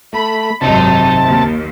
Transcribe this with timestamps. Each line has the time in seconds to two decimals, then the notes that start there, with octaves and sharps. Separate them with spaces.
0.13 A3 B5
0.61 G#1 F#2 C3 D#4 A5
1.25 D#2